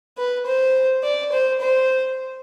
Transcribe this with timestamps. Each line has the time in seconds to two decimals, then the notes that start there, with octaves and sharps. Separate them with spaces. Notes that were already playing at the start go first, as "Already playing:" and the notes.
0.18 B4
0.46 C5
1.04 D5
1.32 C5
1.61 C5